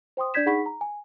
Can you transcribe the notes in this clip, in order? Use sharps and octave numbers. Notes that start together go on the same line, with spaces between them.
C5 G5 C6 D#6
D4 D5 G6 G#6 B6 E7
D#4 G#4 F#5 B5 C#6 B6
A#5
G#5